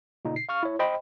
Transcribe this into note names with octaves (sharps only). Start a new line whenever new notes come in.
A#2 C#3 D#4
C7
F5 C#6 F6
E4 C#5
C5 D#5 G5 B5